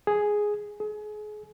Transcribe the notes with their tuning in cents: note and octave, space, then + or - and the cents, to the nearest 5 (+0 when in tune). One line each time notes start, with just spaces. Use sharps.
G#4 +0
G#4 +30